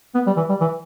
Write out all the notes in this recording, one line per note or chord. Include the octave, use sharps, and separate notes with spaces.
B3
G3
E3
G3
E3